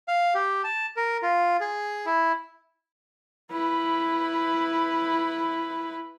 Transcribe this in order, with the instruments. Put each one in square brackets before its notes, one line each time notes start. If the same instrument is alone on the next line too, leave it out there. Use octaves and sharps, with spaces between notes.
[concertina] F5
G4
A5
A#4
F4
G#4
E4
[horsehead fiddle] E4 B4